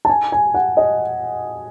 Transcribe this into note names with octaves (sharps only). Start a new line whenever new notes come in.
A5
G#5
G#5
F#5
D#5